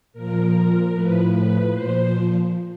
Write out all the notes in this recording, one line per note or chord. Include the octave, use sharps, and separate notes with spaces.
A#2 F3 A#4
A2 F3 B4
B4
A#2 F3 C5